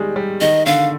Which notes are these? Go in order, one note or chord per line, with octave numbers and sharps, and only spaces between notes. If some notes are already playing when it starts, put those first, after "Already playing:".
Already playing: D#3 G3 G#3
G3
D#3 D#5
D3 F5